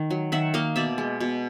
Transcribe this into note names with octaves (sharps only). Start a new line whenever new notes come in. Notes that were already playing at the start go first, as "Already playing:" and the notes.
Already playing: D#3
F#3
D#3 E5 F#5
A#3 D#5 F5
B2 D5 E5
G#3
B2